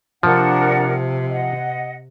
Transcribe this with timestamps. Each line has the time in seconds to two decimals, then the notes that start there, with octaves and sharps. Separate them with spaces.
0.23 C3 F3 D4 A#4 F#5
1.28 D#5 F#5